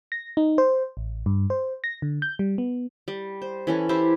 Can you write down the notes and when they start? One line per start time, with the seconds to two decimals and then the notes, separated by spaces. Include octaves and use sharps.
0.12 A#6
0.37 D#4
0.58 C5
0.97 A1
1.26 G2
1.50 C5
1.84 A#6
2.02 D3
2.22 G6
2.39 G3
2.58 B3
3.08 G3
3.42 C5
3.67 E3 C#4 A4
3.89 E4 G4 C5 E5